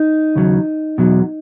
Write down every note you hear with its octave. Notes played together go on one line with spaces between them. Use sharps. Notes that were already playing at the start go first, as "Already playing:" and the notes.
Already playing: D#4
D#2 C#3 F#3
E2 B2 F#3